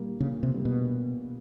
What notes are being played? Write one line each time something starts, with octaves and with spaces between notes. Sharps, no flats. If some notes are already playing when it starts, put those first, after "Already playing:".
Already playing: A#2 G3 A#3
A#2 C#3
C3
G3 A#3
B2